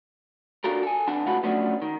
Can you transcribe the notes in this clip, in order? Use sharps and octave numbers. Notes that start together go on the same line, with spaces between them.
D4 F4 F#4 A4 A#4
A4 G#5
F2 B3 D4 A5
C#2 A2 F4 F#4 B4
F3 F#3 A3 B3 C#4 D4
D#3